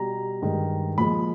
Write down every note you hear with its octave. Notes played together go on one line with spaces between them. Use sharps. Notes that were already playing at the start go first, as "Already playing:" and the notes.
Already playing: B2 G3 A#5
G2 D#3 G#3
A#2 F3 G#3 B5